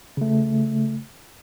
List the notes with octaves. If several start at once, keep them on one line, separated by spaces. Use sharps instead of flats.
C#3 A3